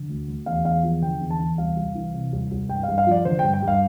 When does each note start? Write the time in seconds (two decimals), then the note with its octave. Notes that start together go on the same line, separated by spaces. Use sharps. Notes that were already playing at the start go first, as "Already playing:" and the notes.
Already playing: D3
0.09 D2
0.28 D2
0.46 E2 F5
0.65 E2 F5
0.83 F3
1.02 D3 G5
1.21 E2
1.30 A5
1.39 E2
1.58 C2 F5
1.76 C2
1.95 E3
2.14 C3
2.33 C2
2.52 C2
2.69 G2 G5
2.83 G2 F5
2.98 F5
3.07 F3 D5
3.25 D3 C5
3.39 G2 G5
3.54 G5
3.63 G2
3.68 F5